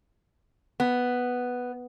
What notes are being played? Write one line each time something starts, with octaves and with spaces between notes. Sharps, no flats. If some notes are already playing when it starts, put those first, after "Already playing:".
B3